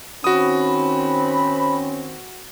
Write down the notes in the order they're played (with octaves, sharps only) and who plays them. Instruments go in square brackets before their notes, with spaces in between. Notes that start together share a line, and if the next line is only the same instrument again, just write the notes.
[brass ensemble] D#3 C4 [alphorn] C#4 [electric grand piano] F#4 D#6 [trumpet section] B5